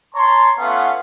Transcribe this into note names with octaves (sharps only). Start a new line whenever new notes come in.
C#5 A5 A#5 C6
A3 B3 C#4 F4 F5 F#5